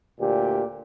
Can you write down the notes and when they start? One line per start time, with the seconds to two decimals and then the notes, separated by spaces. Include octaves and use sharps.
0.19 D2 A#2 G4